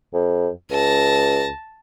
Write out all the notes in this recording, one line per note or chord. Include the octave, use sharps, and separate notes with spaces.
F2
C#2 A5 A#6